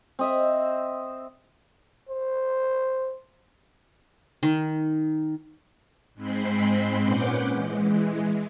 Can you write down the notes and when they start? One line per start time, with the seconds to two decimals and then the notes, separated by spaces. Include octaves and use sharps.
0.19 C4 D#5 E5
2.09 C5
4.43 D#3
6.14 G#2 G#3 C4 B5 C6
7.03 A#2 C#4 B4 F#5 D6 G6
7.53 E3 G#3